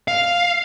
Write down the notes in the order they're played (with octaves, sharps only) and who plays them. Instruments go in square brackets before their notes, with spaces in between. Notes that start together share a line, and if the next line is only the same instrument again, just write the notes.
[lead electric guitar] F5